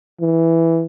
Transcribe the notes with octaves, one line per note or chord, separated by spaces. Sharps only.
E3